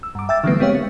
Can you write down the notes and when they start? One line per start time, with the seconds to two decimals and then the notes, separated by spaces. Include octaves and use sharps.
0.03 E6
0.15 G2 D6
0.29 E5 G5 E6 A6
0.44 D3 E3 F#3 G3 A3 B3
0.60 G#3 C4 G4 C#5 F5
0.75 A#3